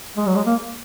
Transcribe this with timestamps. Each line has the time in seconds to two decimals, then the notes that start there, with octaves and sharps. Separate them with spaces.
0.17 G#3
0.26 F#3
0.36 G#3
0.46 A#3